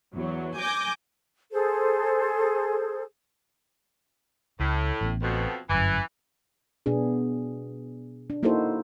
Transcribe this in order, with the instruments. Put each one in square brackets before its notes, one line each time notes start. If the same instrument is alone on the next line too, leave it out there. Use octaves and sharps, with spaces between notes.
[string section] E2 F#3
G#5 D6 G6 A#6
[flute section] G#4 A4 C5
[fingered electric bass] C#2 [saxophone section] A2
[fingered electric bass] A1 B3
[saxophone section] F2 B2
[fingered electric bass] G1 F#2 [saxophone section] E3
[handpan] B2 B3 D4 G#4
D4
A#3 D#4 E4 F#4 A4 C5